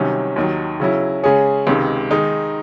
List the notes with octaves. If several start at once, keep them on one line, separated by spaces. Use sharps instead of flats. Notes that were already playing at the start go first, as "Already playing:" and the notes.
Already playing: C2 C3 D#3 F#3 C#4
D#2 D#3 F#3
C#3 F#3 C#4 E4
C#3 G#3 C#4 G#4 C#5
C#2 C3 D#3 G#3
D#3 G#3 D#4